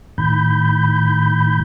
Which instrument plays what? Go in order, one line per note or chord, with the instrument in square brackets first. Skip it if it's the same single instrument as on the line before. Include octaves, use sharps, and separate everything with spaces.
[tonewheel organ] A2 D#3 B5 G6